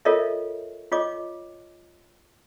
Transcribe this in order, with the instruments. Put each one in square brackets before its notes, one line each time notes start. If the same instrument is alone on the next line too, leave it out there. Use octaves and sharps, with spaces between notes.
[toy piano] F4 A4 A#4 C#5 D#5 E5
F4 C#5 D#5 D6